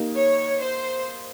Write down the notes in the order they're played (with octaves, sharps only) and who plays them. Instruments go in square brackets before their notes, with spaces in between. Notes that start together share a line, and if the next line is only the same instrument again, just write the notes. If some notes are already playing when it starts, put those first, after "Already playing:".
Already playing: [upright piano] A#3 D#4 G4
[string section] C#5
C5